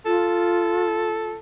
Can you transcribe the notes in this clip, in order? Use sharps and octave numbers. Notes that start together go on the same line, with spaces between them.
F4 A4